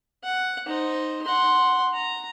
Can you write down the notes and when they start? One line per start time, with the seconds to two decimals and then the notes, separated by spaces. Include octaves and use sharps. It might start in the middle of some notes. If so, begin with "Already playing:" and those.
0.24 F#5
0.67 D#4 C5
1.24 F#5 C6
1.94 A#5